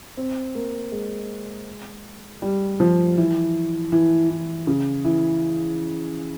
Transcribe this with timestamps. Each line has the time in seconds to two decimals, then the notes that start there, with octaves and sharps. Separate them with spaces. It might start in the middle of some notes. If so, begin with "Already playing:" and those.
0.17 C4
0.55 A#3
0.92 G#3
2.42 G3
2.80 F3
3.17 E3
3.92 E3
4.30 E3
4.67 C#3
5.04 E3